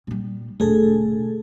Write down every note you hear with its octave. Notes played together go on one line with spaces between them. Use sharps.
A#2 G3
E1 D3 A3 G#4 A4